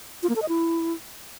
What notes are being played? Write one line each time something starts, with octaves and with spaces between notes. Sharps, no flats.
F4
A#3
A4
D#5
E4